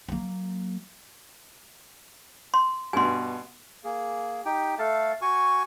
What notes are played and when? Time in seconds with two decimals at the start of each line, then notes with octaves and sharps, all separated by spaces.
0.08 F#3 A#3
2.54 C6
2.93 G2 B2 G#5 C6
3.84 A#3 G#4
4.45 D#4 G4 G5
4.79 A3 A4 F5 A5
5.22 F#4 G#5 C#6